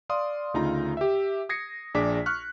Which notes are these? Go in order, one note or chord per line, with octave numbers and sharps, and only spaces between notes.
D5 F5 C6 D#6
D2 C#3 D#4 F4 A#5
G4 E5
D#6 G#6 A#6 C7 C#7
A#1 D4 G#4 D6 B6
C#6 F6 F#6